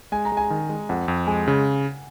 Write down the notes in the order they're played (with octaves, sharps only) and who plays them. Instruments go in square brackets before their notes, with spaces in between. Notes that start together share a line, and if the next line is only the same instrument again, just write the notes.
[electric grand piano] G#3 [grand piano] G#5
[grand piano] A#5
[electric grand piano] G#3
[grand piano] G#5
[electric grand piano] D#3
G#3
[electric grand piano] F2 [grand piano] F#5
[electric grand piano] F2
[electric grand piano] G#3 [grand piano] G#5
[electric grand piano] C#3 [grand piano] G#5